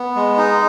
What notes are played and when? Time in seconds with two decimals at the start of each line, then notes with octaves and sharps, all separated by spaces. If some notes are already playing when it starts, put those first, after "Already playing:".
Already playing: B3
0.16 G#3
0.38 D#4